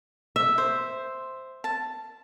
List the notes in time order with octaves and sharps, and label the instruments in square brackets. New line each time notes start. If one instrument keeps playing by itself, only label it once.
[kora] E5
[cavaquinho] C5
A5